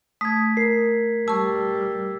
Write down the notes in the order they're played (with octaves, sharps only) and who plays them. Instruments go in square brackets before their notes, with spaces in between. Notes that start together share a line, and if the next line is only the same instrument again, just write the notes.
[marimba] A3 [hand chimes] D#6 [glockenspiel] G#6 B6
[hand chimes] A#4 [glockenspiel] C7
[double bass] G3 [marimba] A5 C#6 [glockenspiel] E6